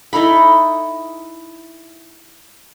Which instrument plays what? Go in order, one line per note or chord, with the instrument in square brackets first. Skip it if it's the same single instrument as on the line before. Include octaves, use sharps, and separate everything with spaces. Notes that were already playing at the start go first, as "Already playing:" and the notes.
[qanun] D#4 E4 A4 B5